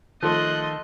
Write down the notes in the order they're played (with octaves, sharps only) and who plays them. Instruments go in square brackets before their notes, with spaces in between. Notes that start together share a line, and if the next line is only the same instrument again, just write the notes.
[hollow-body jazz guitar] D#3 [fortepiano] F3 A3 [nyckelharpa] D#5 C6 [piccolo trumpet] F#6